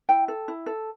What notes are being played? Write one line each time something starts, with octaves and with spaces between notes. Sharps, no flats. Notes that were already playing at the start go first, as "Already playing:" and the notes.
E4 G5
A4
E4
A4